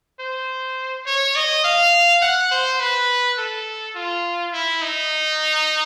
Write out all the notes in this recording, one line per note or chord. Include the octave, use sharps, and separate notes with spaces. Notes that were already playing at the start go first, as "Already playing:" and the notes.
C5
C#5
D#5
F5
F#5
C5
B4
A4
F4
E4
D#4